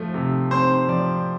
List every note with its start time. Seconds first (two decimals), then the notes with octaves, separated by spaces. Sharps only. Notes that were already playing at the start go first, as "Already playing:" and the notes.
Already playing: F3 A3
0.14 C3
0.51 C4 C5
0.88 F3 D5